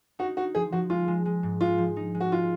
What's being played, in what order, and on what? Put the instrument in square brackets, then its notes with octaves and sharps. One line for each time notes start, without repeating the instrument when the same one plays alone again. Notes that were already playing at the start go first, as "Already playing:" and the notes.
[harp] D#4 [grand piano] F#4
[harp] D#4 [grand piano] F#4
[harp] F3 [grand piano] G#4
[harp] F3 [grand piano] F#4
[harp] G#3 [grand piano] F4
[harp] G#3
G#3
G#2
[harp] G#3 [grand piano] F4
[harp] F3
D#4
G#3
[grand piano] F#4
[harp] G#3 [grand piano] F4